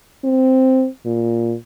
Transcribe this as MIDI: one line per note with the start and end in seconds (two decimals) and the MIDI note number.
0.24 0.87 60
1.05 1.55 46